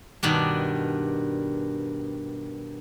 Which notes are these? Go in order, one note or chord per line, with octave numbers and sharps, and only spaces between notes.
G2 B2 D#3 D4